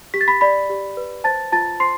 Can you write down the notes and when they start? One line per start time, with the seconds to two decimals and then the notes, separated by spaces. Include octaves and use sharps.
0.14 G4 B6
0.21 A6
0.28 B5 B6
0.41 D5 B5 B6
0.70 G4
0.97 B4
1.24 C5 A5 A6
1.52 F4 A5 A6
1.80 C5 C6 C7